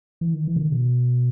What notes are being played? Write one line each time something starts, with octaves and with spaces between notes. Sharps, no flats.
E3
D#3
E3
C#3
D#3
B2